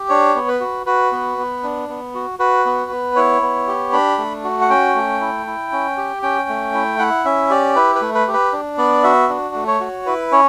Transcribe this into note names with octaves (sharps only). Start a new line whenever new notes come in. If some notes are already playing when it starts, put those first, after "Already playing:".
Already playing: G4
D4 C#5
B3
B4
F#4
F#4 B4
B3
B3
D4
B3
F#4
F#4 B4
B3
B3
E4 C#5
B3
G4
D4 B5
A3
F#4
F#5
C#4 G5
A3
E4
E4
C#4
G4
C#4 G5
A3
E4
E4 F#5
C#4 E5
G4 D5
E4 B4
B4
A3
B4
G4
B4
D4
B3 D5
F#4 E5
D4
A3
C#5
F#4
E4 B4
C#4 C#5